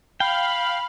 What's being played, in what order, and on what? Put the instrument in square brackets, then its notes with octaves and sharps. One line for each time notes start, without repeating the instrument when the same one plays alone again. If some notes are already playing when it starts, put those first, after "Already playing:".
[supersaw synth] F5 [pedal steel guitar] G5 [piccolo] B5